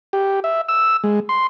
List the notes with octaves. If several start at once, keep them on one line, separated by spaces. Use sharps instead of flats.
G4
E5
E6
G#3
C6